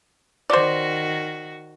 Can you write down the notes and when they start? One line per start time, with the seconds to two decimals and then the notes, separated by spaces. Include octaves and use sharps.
0.50 D#3 F#4 C5 D5